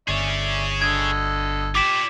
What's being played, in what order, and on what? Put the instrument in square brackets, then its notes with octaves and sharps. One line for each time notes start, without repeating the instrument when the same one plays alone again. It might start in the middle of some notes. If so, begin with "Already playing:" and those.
[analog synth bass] G1 [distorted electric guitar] G#4 C#5 [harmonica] D5 E5 C#6
[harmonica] D3 A4 D#5 [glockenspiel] G#6
[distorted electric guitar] F4 D5 [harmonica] G4 [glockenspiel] D6 B6 E7